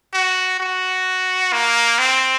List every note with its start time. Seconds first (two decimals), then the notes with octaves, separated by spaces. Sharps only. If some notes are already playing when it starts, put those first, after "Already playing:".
0.14 F#4
0.60 F#4
1.52 A#3
1.99 C4